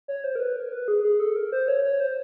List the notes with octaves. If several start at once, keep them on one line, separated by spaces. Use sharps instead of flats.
C#5
C5
A#4
B4
A#4
B4
G#4
G#4
A4
A#4
C5
C#5
C#5
C5